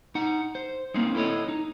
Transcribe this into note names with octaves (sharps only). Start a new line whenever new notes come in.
D#4 F#5
C5
A#3 C4 C#4 D#4
E4 A4 C5 C#5 D#5
D#4